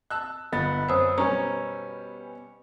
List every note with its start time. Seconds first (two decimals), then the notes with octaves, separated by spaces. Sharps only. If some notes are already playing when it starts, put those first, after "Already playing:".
0.10 A5 E6 F#6
0.52 G1 B3 D#5 A6
0.89 F#2 C5 D#6 E6
1.18 B2 G3 C#4 G4 B4 G#5 A#5